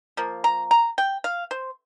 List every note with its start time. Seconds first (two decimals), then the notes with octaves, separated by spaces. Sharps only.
0.17 F3 A#3
0.44 A#5
0.71 A#5
0.98 G5
1.24 F5
1.51 C5